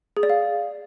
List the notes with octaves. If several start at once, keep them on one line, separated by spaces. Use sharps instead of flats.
G#4
D5
F5